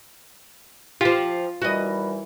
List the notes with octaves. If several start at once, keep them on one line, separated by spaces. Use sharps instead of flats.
F3 F4 G4
D#2 E3 G3 F#4 D#5